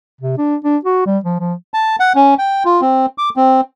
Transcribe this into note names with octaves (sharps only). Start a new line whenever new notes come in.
C3
D4
D4
F#4
G3
F3
F3
A5
F#5
C#4
G5
F4
C4
D6
C4